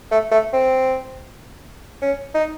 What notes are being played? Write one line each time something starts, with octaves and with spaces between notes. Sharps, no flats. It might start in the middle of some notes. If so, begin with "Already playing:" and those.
A3
A3
C4
C#4
D#4